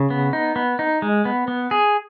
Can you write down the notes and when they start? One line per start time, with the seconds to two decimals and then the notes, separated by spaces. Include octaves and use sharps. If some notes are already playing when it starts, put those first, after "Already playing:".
Already playing: C#3
0.10 B3
0.33 D#4
0.56 B3
0.79 D#4
1.02 G#3
1.25 B3
1.48 B3
1.71 G#4